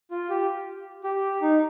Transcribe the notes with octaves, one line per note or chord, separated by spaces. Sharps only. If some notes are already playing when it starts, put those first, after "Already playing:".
F4
G4
G4
D#4